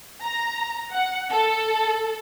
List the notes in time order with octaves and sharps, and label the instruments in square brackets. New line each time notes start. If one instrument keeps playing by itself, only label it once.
[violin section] A#5
F#5
A4